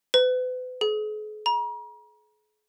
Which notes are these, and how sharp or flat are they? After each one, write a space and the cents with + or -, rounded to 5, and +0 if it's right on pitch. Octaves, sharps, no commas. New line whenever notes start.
B4 +40
G#4 +45
A#5 +40